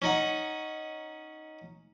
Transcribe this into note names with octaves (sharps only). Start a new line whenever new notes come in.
C#4 D#4 F#5